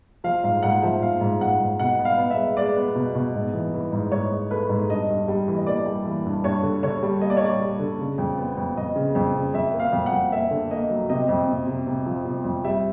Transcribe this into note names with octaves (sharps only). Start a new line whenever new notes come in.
F3 F5
G#2 F5
G#2 F#5
F3 E5
G#2 F5
G#2
G#2 F#5
G#2
B2 F#5
B3
F5
B3
E5
G#3
G#3 D5
B3
B2
B2
G#2
E3
E3
G#2
G#2 C#5
G#2
A3 B4
G#2
G2 D#5
G2
G3
E3
D#5
A#3 D5
G3
E3
G2
G2 C#5
D3
D3 C#5
G3
A#3 D#5
D5
C#5
G3 D5
G3
D3
C#3
F2
B3
F2
F2 D#5
C#3
F2
C#3
F2 E5
A#3
F5
F2
F#5
F2
A#3 E5
D3
A#3 D#5
F#3
C3 D#5
F2
C3
C3
C3
F3
C3
F2
G3 E5